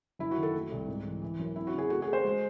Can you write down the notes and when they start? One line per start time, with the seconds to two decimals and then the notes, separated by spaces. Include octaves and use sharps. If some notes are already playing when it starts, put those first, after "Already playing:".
0.19 F#1 E4
0.31 F#4
0.38 D#3
0.43 A4
0.54 A3
0.72 C2
0.88 G#2
1.06 E3
1.22 E3
1.39 F#2
1.56 C4 E4
1.67 F#4
1.73 C#3 G#4
1.90 A3 F#4
2.02 G#4
2.08 A3
2.13 C5
2.24 G#3